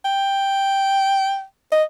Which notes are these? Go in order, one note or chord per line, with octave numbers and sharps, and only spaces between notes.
G5
D#5